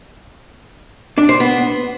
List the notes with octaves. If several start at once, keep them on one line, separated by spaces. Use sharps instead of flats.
D4
C5
B3